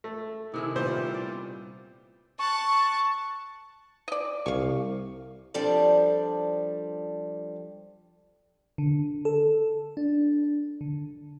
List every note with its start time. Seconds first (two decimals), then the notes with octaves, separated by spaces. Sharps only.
0.04 A3
0.54 C3 D#3 E4 G#4
0.76 A#2 G3 A3 B3 F4 C5
1.14 D5
2.39 A5 C#6 F#6
4.08 D5 D#5
4.46 C2 F5 C#6
5.54 F3 G3 C4 D4 A4 D5
8.78 D3
9.25 A4
9.97 D4
10.81 D3